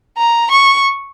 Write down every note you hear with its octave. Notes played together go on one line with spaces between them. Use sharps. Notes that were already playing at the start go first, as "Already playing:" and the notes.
A#5
C#6